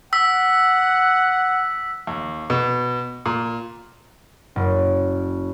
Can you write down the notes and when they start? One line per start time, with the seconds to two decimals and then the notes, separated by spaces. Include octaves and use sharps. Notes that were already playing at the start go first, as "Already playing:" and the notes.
0.13 F#5 E6 B6
2.07 D#2
2.50 B2
3.26 A#2
4.56 F#1